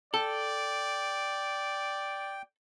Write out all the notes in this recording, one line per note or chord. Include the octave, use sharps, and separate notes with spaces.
A4 D5 G5